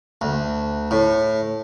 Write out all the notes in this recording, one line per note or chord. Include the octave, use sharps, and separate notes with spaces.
D2
A2